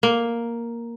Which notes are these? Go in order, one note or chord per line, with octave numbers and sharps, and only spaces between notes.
A#3